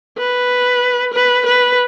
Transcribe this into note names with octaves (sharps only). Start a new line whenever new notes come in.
B4
B4
B4